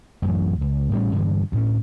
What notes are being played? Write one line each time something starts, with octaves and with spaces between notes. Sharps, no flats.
A1 F#2 E3 F#3
C#2
A1 A2 G3 C#4
G2 D3 E3
D2 A2 G#3 C#4